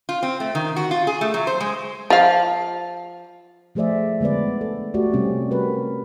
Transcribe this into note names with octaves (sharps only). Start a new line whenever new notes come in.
F4
C4
A3
D#3
F#4
F4
G#4
A3
F#3
C5
G#3
F3 F5
F3 A3 G#4 C5 D5 E5
D3 G#3 B3 B4 D5
A4
A3 F#4 G4 D5
C3 G3 C4 C#4
G3 F#4 A#4 B4